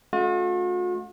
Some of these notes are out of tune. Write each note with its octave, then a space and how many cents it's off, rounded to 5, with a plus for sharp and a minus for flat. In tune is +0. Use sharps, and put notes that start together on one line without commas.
A3 -25 C#4 +0 F#4 -45